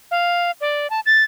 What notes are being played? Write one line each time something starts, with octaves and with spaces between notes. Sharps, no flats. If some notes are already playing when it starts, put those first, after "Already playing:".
F5
D5
A5
A6